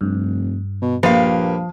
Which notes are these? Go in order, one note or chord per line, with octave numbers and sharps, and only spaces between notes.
F1 G2
B2
A#1 F3 A#3 G4 B4 F5